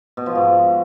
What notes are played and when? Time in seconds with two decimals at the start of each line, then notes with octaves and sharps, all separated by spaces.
0.17 B2
0.26 F3
0.35 G#2